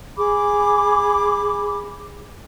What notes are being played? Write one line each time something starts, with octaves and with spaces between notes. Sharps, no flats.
G#4 B5 D6